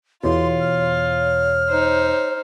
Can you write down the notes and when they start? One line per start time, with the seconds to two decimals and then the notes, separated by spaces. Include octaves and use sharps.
0.23 E2 B2 F4 C#5 C6
0.61 F6
1.69 D#4 C5